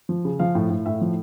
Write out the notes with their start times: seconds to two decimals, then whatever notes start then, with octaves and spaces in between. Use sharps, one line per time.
0.09 F3
0.25 C#3
0.39 F3 F5
0.55 A2
0.70 A2
0.86 A2 E5
1.01 F3